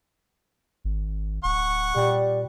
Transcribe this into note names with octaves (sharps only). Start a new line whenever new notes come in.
G#1
D1 F#5 C#6
A#2 G3